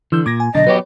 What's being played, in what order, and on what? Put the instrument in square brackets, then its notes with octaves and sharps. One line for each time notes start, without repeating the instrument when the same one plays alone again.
[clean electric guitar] D3 [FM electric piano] E3 E6 G6
[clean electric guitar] A#2 [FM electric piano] D6 G#6 A#6
[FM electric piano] G#5
[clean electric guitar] B1 D4 [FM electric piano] D3 A6 [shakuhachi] D#5
[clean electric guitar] F#3 B3 G4 [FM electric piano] B4 C#5